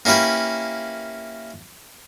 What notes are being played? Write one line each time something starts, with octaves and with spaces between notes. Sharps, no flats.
A#3 C#4 E4 G4 B4